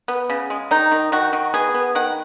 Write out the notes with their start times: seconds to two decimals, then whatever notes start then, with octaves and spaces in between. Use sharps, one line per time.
0.08 B3
0.30 C#3
0.50 G#3
0.71 D#3 D#4
0.92 D#3
1.12 D#3 F#4
1.33 D#3
1.54 B3 G#4
1.75 B3
1.95 D#3 F#5